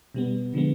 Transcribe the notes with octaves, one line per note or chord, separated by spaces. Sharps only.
B2 G3 B3
D3 F3 G#3 B3